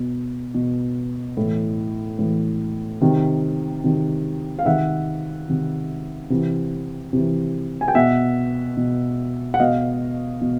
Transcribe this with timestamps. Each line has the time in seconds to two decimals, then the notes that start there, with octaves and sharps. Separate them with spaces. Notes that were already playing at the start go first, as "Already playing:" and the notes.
Already playing: B2
0.55 B2
1.37 A2 E3
2.19 A2 E3
3.01 C3 D#3
3.84 C3 D#3
4.59 F5
4.66 C3 D#3 E5 F#5
5.48 C3 D#3
6.30 C3 E3
7.13 C3 E3
7.81 G#5
7.88 G5
7.95 B2 E5 F#5
8.77 B2
9.54 F#5
9.60 B2 D#5 F5
10.42 B2